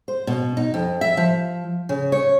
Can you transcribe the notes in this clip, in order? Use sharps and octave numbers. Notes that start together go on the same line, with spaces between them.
C5
B2
D#4
F2
E5
F3
C#3
C#5